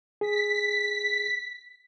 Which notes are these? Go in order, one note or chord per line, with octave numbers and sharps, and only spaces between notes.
G#4 B6